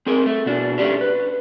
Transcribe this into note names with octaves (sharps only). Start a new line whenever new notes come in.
C4 G#4 A#4
A3
B2 D4
A3 C#4 D4 G4
B4